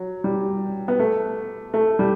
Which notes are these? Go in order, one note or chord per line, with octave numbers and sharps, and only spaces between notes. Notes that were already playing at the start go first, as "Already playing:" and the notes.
Already playing: F#3
G3
B3
A3
A3
G3